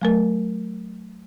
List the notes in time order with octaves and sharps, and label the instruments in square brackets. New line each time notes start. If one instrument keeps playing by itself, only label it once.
[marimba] F#3 A3 A#4